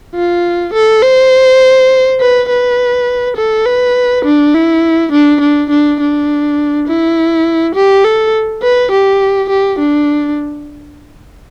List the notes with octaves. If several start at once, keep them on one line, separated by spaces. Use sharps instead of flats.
F4
A4
C5
B4
B4
A4
B4
D4
E4
D4
D4
D4
D4
E4
G4
A4
B4
G4
G4
D4